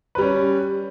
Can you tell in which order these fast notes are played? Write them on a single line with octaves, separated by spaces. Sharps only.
B4 G3 C#4